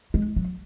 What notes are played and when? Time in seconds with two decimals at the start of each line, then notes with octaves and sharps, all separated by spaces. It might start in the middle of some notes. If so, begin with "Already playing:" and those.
0.14 G#3
0.36 F#3